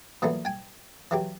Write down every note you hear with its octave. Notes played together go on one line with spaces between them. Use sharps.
A#2 E3 F#3 A3 B3
G5 G#5
E3 F#3 G4